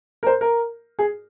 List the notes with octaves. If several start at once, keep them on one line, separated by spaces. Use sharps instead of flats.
A#4
C5
A#4
G#4